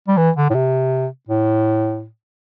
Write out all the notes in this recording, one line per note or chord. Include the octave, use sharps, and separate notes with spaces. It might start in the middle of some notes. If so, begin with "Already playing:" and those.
G3
E3
D3
A2
C3
A2